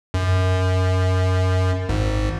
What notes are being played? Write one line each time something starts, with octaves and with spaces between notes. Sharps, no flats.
F#2
G#1 G#2